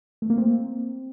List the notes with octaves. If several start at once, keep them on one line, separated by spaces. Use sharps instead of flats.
A3
A#3
C4